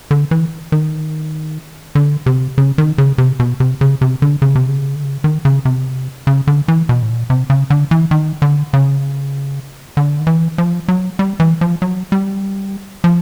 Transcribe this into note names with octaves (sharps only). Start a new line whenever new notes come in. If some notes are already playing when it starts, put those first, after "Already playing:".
D3
E3
D#3
D3
C3
C#3
D#3
C#3
C3
B2
C3
C#3
C3
D3
C#3
C3
C#3
D3
C#3
D#3
C#3
C3
C#3
D3
E3
B2
A2
A#2
C3
C#3
D3
E3
D#3
D3
C#3
D3
D#3
E3
F3
F#3
G3
E3
F3
F#3
G3
F3